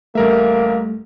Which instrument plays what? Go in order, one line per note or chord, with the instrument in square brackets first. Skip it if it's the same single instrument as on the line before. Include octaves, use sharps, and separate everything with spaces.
[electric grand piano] A1 A#4 E5 [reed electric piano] G3 A3 [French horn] A#3